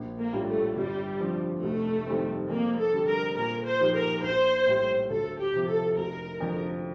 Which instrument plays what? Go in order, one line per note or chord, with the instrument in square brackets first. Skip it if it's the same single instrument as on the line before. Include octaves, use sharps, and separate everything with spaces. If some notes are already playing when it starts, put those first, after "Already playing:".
Already playing: [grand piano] A#1
[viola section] A#3
[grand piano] A2 G3 D4 F4
[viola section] A3
[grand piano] G1 [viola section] G3
[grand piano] G2 F3 C4
[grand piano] F1 [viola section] A3
[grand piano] F2 D#3 G3 C4
[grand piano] F2 [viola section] A#3
[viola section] A4
[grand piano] D3 G3
[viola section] A#4
[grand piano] A#2 [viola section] A#4
[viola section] C5
[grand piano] F3 A#3 D#4 G4
[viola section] A#4
[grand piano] A#1 [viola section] C5
[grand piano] A2 G3
[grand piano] D2 [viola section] A4
[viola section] G4
[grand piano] C3 F3
[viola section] A4
[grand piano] F1 [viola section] A#4
[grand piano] F2 D3 F3